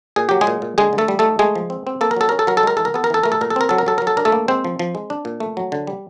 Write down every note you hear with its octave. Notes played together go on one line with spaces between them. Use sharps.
A#2 G#4
F#3 G4
G#3 G#4
A#2
A#2
D3 G#3 G#4
D3
A3 A4
G3
A3 D#4 A4
G#3 A3 G#4
F3
C4
C4
A#3 A4
A#4
F#3 A4
C#4 A#4
A4
F#3 A#4
A4
G#3 A#4
E3 A4
A#4
B3 A4
A#4
E3 A4
A3 A#4
A4
A#2 A#4
A4
C4 A#4
F#3 A4
A#4
F#3 A4
F#3 A#4
A4
D4 A#4
A3 A4
A#3
G#3 C4 C5
F3
F3
G#3
D4
A#2
A3
F#3
D3
G3